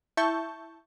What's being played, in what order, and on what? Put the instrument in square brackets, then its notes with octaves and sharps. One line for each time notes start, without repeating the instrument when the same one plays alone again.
[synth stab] E4 E5 A5 C#6 G6